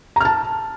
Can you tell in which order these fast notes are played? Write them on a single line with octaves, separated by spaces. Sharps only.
A#5 F6 A5